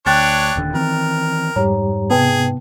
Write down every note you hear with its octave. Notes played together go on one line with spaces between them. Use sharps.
D2 D4 C#5 G5 F#6 A6
D#1 D#2 D3
D#3 E3 C4 A#4
F2 G#2 G3 G4 C#5 A#5
C3 B3 G#4 B4 G5 A5